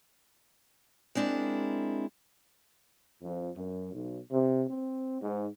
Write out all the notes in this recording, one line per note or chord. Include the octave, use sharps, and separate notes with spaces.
G#3 C4 D4 E4 A#4
F2
F#2
B1
C3
C4
G#2